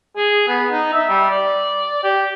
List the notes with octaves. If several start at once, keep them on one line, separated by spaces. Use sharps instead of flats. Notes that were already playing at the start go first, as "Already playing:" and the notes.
G#4
B3
D#4
E5
G3
D5
G4